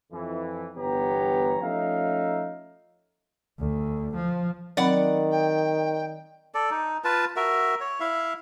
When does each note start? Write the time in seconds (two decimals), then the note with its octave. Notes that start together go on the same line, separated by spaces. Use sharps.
0.12 F2 E3
0.76 G1 E3 B3 G4 C#5 A#5
1.61 F3 A3 C#4 D#4 E5 F5
3.59 D2
4.16 F3
4.77 D#3 F#3 C4 D5 F#5 B5
5.31 G5
6.55 A4 D5
6.71 D#4
7.04 F4 B4 A5
7.36 F#4 A#4 E5
7.80 C#5
8.00 E4 E5 F5